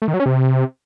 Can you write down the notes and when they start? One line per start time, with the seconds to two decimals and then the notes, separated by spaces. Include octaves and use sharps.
0.02 A3
0.08 D#3
0.14 F#3
0.20 C#4
0.26 C3